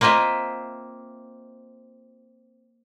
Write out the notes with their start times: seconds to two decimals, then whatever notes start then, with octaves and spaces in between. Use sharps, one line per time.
0.01 A#3 C4 F4 D#5 E5